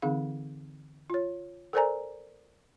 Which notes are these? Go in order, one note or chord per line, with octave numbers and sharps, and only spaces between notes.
D3 E3 C4 D#4 G#4 F5
F4 C#5
A4 A#4 C5 D5 G#5 A#5